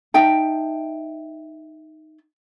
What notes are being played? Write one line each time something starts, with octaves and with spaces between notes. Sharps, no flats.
D#4 E5 G5 A5